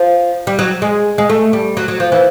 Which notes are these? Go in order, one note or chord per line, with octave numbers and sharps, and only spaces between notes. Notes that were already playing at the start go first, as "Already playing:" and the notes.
Already playing: F3
G3
F#3
G#3
G#3
A3
G3
F#3
F#3
F3
E3